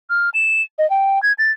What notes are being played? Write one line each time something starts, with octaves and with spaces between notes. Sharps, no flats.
F6
E7
D#5
G5
G#6
A6